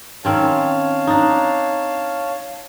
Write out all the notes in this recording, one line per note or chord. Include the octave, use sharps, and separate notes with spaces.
D#3 C4 C#4 C#5 F5 A5
D4 D#4